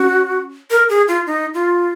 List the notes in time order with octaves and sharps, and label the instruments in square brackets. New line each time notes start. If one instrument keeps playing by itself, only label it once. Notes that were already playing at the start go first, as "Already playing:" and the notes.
Already playing: [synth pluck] C#4 [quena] F#4
[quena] A#4
G#4
F4
D#4
F4